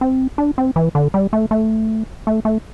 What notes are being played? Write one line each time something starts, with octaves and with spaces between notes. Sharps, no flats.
C4
D4
C4
E3
D3
G3
A3
A3
A3
A3